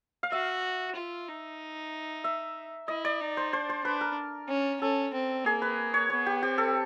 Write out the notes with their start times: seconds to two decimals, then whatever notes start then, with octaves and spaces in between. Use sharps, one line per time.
0.23 F5
0.31 F#4 E5
0.96 F4
1.28 D#4
2.24 E5
2.88 E4 D#5
3.05 D5
3.21 D#4
3.37 C5
3.53 D4 C5
3.69 C5
3.85 D4 B4
4.01 A#4
4.49 C#4
4.81 C#4 A4
5.14 C4
5.45 A#3 G#4
5.62 B4
5.94 C#5
6.10 B3 C#5
6.26 G4
6.42 C4 G4
6.58 A4